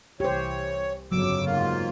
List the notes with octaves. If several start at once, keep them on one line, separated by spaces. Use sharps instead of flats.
C2 E3 G4 C5 C#5
G1 F2 C#3 F#3 D6 E6
G#2 A#3 F4